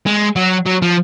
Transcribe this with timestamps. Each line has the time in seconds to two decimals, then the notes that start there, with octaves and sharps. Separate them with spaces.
0.07 G#3
0.36 F#3
0.66 F#3
0.82 F3